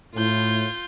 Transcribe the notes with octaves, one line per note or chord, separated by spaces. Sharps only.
A2 F4 G6